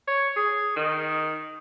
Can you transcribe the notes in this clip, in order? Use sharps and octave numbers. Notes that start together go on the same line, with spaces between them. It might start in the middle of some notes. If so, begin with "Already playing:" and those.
C#5
G#4
D#3